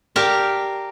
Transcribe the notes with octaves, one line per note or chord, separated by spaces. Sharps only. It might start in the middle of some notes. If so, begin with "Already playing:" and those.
G4 A#4 D5 F5 G5 A5